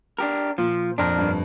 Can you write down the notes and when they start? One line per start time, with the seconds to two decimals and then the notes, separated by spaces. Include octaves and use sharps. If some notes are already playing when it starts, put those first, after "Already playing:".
0.19 D4 G4 A#4
0.58 A#2 F3
0.98 F2 D4 A#4
1.19 G2